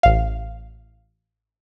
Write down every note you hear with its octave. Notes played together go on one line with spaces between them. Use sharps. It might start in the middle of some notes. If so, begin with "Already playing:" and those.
A1 F5